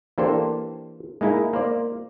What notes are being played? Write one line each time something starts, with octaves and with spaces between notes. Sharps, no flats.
E3 A#3 D4 G4 A4 C5
G#3 A#3 D#4 E4
A#3 C5 D5